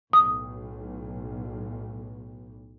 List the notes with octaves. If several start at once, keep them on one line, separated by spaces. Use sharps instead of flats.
B1 A2 D#6